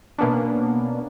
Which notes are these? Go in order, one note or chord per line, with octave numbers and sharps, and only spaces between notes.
B2 A#3 B3 C#4 D4